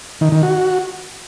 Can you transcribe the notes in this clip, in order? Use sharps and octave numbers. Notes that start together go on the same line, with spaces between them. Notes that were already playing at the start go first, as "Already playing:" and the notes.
D#3
D#3
F#4